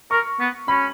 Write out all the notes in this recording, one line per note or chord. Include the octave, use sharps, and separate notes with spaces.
A#4 C#6
B3
C#4 B5